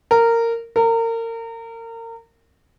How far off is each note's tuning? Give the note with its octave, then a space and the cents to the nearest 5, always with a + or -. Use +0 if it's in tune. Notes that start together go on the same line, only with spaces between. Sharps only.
A#4 -15
A#4 -30